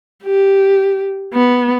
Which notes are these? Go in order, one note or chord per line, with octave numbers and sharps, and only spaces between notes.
G4
B3